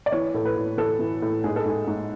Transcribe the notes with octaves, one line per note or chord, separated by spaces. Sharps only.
D5
E3 C#5
A2 A4
B4
A2
E3 A4
E3
A2
G#2 G#4
A4
G#2 G#4
G#2